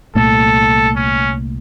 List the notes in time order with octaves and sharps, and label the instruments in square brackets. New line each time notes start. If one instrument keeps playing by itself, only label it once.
[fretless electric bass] C2 A#2 A3 [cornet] A4
[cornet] C#4